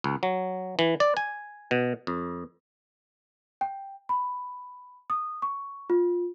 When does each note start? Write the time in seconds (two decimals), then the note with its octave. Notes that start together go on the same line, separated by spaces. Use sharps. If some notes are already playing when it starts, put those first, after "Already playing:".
0.04 C#2
0.23 F#3
0.79 E3
1.00 D5
1.17 G#5
1.71 B2
2.07 F2
3.61 G5
4.09 B5
5.10 D#6
5.42 C#6
5.90 F4